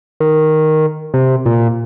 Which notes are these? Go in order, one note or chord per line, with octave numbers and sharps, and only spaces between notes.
D#3
C3
A#2